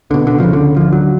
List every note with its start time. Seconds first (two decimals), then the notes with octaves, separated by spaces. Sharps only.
0.10 C#2 B2 D3
0.27 D3
0.40 D2 C#3 F3
0.53 D3
0.76 D2 D3 F3
0.93 F#3